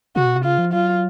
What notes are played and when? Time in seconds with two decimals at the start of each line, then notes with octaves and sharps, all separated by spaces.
0.16 C3 F#4
0.26 B2
0.35 C3
0.45 C#3 F4
0.58 F3
0.73 F#3 F4